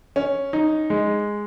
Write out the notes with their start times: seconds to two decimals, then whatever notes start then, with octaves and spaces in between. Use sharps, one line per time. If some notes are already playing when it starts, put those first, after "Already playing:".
0.16 C#4
0.53 D#4
0.90 G#3